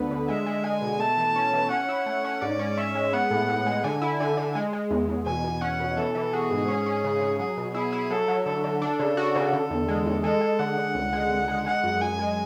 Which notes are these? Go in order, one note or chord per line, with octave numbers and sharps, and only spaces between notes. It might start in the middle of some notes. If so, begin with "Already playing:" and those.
Already playing: D2 D3 B3
D3
G#3 E5
G#3
G#3 G#5
B2
A3 A5
E3
C#4
E3
C#4 F#5
E4
A3
C#4
G#2 D5
C#4
C#4 E5
G#3
B3 F#5
A2
A2
G#3
D3 G#5
E4
D3 G#5
D3
G#3
G#3
E2
E2
B2 G#5
B2
C#4 F#5
B2
E3 A4
E3
F#4 G#4
G#2
C#4
C#4
C#3
C#3
F#3 G#4
B2
E4 G#4
E4
F#3 A4
F#3
D3 A4
D3
D4
C#3
F#4
C#3
D3
E2
G#3
E2
G#3 A4
G#3
D3 F#5
D3
C#2
G#3
C#2
G#3
G#3 F#5
F#2
F#2 G#5
G#3